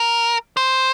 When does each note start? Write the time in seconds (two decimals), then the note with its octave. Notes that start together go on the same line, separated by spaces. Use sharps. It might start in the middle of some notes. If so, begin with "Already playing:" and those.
Already playing: A#4
0.57 C5